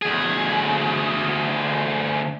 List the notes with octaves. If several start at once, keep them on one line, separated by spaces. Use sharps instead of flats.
D2 G#4